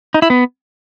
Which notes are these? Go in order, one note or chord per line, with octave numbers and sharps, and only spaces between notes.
D#4
E4
B3